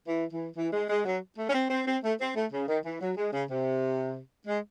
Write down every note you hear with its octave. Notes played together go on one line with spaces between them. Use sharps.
E3
E3
E3
G#3
G#3
F#3
A3
C#4
C4
C4
C4
A3
C4
A3
C#3
D#3
E3
F#3
G#3
C#3
C3
G#3